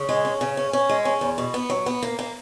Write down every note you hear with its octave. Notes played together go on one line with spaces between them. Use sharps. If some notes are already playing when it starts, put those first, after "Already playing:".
Already playing: C#3
G#3
C#4
C#3
C#4
C#4
G#3
C#4
E2
B2
B3
F#3
B3
A#3
A#3